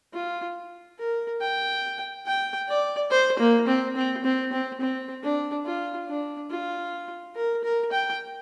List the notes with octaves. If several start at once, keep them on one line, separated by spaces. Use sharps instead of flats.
F4
A#4
G5
G5
D5
C5
A#3
C4
C4
C4
C4
C4
D4
F4
D4
F4
A#4
A#4
G5